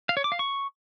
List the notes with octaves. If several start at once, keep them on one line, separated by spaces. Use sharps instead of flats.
F5
C#5
D6
F5
C#6